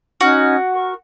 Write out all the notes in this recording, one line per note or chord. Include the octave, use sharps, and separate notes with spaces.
C#4 D#4 F#4 F6
A#4 C#6